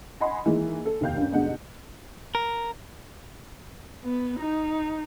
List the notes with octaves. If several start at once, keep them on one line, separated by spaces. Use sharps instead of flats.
D#5 F#5 G#5 B5 C6
D#3 E3 G#3 A#3
A4
F1 D#2 B2 F5 G5 G6
G2 C#4
B1 G2 B2 D3 G#3 F#5
A#4
B3
D#4